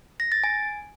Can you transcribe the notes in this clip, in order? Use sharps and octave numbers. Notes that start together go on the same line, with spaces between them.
A#6
A6
G#5